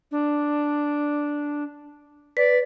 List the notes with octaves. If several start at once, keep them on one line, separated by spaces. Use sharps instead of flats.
D4
B4 D5